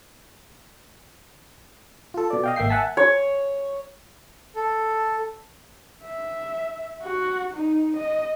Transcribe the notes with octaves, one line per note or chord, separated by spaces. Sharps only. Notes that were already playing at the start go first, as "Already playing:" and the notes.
F4 A4
B2 D5
D#5 F5 G5
G#1 A#3 E5 G5 C7
E5 F#5 G#5 A5 B6
C#5
A4
E5
F#4
D#4
D#5